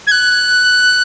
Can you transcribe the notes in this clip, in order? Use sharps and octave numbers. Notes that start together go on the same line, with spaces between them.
G#6
F#6